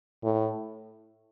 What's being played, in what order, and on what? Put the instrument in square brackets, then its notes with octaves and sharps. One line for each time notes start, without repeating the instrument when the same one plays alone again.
[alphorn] A2